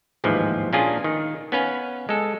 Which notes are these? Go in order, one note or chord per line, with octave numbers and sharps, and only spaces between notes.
A1 D#2 G#2 E3 F3
A#2 A#3 C#4 D4 F4 G#4
D#3
B3 C#4 B4 F5
G#3 A4